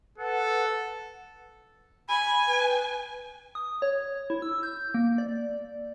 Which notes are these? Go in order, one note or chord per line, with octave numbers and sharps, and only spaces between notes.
A4 B4 F#5
G#5 B5
B4
D#6
C#5
E4
E6
G6
A#3
D5